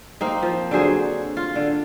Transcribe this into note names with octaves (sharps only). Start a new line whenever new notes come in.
A#3 C4 D#4
F3
D3 F#3 G#4 C5
F4
D3